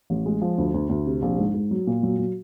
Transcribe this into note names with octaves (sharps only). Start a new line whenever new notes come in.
A1
G#3
F3
D2
D2
D2
C3
A#1
G#2
G#2
F#3
A#2
F#3
F#3